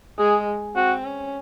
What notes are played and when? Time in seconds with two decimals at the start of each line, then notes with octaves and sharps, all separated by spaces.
0.19 G#3 G#4
0.76 C4 F#4
1.05 C#4